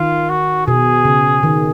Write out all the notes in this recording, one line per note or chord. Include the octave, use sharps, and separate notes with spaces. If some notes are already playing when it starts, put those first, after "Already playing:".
Already playing: D#3 F4
F#4
B2 G#4
C#3
D#3